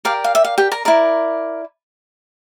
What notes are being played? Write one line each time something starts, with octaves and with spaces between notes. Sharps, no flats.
G4 A#4 D5 F5
F5
E5
F5
G4 G5
A#4 A#5
E4 A#4 D5